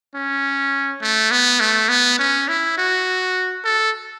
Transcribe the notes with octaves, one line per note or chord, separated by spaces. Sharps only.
C#4
A3
B3
A3
B3
C#4
E4
F#4
A4